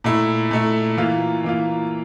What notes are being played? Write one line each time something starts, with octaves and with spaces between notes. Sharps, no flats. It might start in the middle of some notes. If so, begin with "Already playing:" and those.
A#2 A3 E4
A#2 A3 E4
E3 A#3 F4
E3 A#3 F4